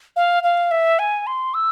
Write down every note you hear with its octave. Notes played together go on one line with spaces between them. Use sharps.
F5
F5
E5
G#5
C6
E6